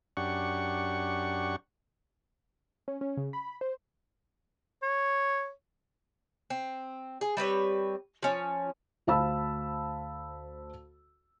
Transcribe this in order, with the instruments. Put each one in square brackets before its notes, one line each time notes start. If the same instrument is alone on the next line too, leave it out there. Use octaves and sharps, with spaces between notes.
[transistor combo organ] F#2 D4 G4 F#5 C#6
[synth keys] C#4
C#4
C#3
B5
C5
[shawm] C#5
[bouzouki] C4
G#4
G3 C4 B4 C#5
F3 C#4
[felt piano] D2 C5 F5 A5 B5 E6